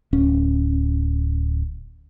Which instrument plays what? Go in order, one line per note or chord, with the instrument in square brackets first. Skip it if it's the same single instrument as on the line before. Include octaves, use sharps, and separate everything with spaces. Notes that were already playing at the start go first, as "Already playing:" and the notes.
[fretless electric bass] D1 C#4